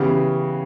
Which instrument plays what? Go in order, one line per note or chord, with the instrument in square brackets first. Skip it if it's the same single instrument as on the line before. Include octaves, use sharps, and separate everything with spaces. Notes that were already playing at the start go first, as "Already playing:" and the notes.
Already playing: [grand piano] C#3 E3 B3 F#4 [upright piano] G4